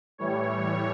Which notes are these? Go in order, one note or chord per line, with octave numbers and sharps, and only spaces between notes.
A2 E3 G3 C#5